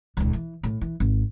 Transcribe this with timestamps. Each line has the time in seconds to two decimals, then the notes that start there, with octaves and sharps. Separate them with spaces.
0.17 D#1 C#2
0.33 E3
0.63 A2
0.81 E3
1.00 G#1